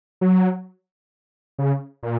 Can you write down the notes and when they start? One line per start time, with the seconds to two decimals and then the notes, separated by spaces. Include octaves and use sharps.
0.21 F#3
1.59 C#3
2.03 A#2